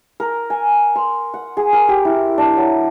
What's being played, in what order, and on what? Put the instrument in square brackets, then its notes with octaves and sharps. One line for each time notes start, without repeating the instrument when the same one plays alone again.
[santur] A#4
G#5
C6
F#5
G#4
A#4
G4
E4
D4
F#3